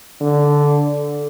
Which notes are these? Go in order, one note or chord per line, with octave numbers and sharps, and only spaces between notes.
D3